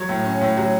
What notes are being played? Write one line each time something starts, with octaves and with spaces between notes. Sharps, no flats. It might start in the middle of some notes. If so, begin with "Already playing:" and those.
Already playing: F#3 C#5
A2
C#4
A2
F#3